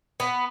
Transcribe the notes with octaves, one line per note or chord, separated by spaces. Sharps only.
B3